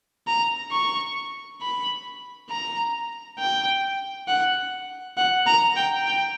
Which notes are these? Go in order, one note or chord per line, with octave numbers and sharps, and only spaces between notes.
A#5
C#6
B5
A#5
G5
F#5
F#5
A#5
G5
G5